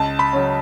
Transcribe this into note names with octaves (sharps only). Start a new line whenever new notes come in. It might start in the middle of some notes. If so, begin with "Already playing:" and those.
Already playing: C#2 A5
B5
C#3 F#3 C#4